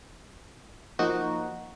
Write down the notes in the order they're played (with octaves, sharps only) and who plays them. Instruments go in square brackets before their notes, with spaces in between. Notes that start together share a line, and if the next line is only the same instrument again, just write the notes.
[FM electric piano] F3 A#3 D#4 F#4